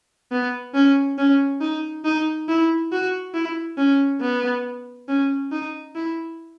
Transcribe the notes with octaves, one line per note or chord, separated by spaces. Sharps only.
B3
C#4
C#4
D#4
D#4
E4
F#4
E4
C#4
B3
C#4
D#4
E4